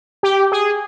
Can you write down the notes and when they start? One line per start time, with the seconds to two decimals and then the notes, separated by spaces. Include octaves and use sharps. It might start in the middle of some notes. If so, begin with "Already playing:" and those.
0.23 G4
0.52 G#4